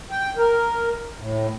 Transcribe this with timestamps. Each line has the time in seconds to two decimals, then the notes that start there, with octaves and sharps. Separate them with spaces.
0.11 G5
0.37 A#4
1.18 A2